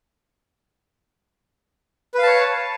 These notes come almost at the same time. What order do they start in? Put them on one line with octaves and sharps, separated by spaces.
B4 F5 A5 C#5